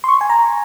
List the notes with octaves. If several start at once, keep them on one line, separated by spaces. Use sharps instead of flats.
C6
C#6
G#5
A#5